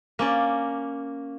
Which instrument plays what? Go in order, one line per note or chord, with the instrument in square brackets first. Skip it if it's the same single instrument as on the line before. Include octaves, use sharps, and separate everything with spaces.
[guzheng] A#3 C#4 D5